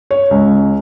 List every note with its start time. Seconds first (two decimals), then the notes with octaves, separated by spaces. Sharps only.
0.11 C#5
0.31 C#2